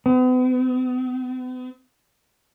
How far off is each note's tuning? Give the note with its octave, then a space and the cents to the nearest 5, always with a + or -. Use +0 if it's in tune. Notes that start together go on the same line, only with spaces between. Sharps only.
B3 +45